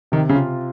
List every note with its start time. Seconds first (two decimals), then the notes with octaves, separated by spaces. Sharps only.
0.12 C3 D#3
0.29 C#3
0.36 F4